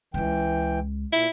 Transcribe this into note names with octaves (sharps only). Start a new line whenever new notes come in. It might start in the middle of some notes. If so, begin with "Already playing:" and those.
C#2 E3 G#3 G5
A#2 E4